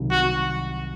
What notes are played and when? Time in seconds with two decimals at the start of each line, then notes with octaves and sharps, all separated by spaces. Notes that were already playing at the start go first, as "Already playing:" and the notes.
Already playing: C2 C3 D#3 F#3
0.11 F#4